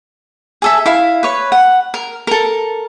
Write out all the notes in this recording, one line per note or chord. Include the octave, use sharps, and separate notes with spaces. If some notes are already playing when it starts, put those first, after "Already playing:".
G#4 A4 E5
E4 F5
B4 C#5
F#5
A#4
A4 A#4